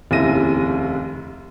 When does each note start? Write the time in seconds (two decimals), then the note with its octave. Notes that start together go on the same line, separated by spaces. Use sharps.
0.11 F1 D#2 C#3 E4 A#6 D#7